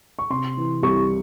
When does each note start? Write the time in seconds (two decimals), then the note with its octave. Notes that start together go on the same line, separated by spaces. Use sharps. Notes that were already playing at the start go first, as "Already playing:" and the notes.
0.19 C#6
0.30 C3 C6
0.57 E3
0.83 C2 C#6